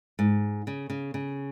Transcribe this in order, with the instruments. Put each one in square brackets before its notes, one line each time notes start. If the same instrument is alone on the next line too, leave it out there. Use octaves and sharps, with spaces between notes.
[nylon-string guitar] G#2
C#3
C#3
C#3